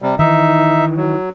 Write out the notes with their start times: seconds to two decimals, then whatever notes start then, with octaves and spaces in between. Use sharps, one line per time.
0.02 C3 G3
0.19 D#3 E3 D#4 E5
0.97 F#3